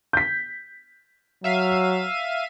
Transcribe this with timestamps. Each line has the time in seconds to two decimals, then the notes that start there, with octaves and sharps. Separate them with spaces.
0.13 G6 B6
1.44 F#3 E5 F5 D#7